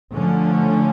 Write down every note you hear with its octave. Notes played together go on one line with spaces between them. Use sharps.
D3 F3 A3 C#4